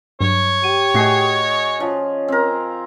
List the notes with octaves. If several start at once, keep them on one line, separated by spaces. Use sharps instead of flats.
G2 F#3 C#5
G4 D#7
A2 A3 F#4 G#4 D#5 C7
F3 C#4
C4 A#4